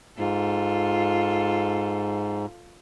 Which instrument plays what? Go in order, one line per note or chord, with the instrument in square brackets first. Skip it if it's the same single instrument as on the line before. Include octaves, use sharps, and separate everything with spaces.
[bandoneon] G#2 [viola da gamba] F4 A4